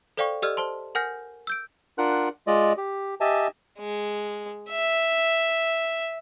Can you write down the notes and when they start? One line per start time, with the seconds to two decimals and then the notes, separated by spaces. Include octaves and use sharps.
0.17 A4 C5 D5 F5 G5 C#6
0.42 G4 A4 D5 D#5 E6 F6
0.57 C5 A5 C6
0.95 A#4 F#5 G#5 F6 G6 A#6
1.47 E6 G6 D7
1.98 D4 F4 A#4 F#5 F#6
2.47 G#3 F4 D5 D#5
2.77 G4
3.21 G4 D#5 E5 G#5 A5
3.79 G#3
4.70 E5